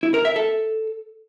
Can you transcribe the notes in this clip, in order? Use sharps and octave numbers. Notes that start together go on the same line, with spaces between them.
E4
A#4
E5
A4